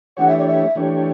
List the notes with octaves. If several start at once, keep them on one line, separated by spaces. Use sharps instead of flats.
E3 A3 D4 G4 C#5 F#5
E5
D5
E5
E3 A3 D4 G4 C#5